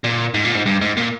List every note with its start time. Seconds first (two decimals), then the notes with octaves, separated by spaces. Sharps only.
0.04 A#2
0.34 G#2
0.45 A#2
0.55 G#2
0.66 G2
0.81 G#2
0.97 A#2